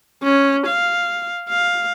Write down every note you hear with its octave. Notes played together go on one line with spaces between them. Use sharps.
C#4
F5
F5